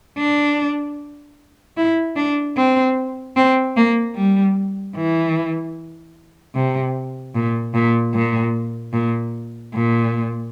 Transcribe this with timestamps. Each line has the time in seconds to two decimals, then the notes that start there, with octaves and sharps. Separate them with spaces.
0.18 D4
1.77 E4
2.16 D4
2.57 C4
3.36 C4
3.77 A#3
4.16 G3
4.96 E3
6.55 C3
7.35 A#2
7.74 A#2
8.14 A#2
8.93 A#2
9.74 A#2